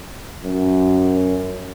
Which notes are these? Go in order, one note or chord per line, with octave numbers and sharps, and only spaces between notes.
F#2